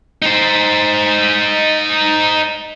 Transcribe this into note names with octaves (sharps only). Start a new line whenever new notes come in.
D#4 C5